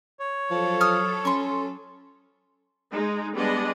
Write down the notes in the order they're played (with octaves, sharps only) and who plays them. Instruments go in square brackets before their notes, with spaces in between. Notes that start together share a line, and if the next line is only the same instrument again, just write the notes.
[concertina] C#5
[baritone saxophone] F3 [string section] F#3 A4
[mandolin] D#6 F6
[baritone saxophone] C#4 [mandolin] C6 C#6
[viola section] G#3 D#4
G3 G#3 B3 D4 D5 D#5